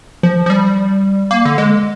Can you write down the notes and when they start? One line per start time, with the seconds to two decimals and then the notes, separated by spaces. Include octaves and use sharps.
0.23 F3
0.46 F3
0.50 G3
1.31 A#3
1.45 D3
1.58 G#3